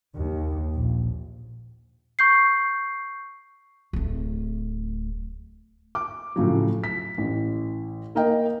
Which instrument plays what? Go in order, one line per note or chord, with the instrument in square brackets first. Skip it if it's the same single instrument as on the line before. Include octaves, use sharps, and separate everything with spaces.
[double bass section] D#2
A#1
[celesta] C#6 G6 C7
[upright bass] D1 A3
[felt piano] D6
A2 C#3 F3 F#3
B6
A1 E3
A#3 A#4 D#5 G5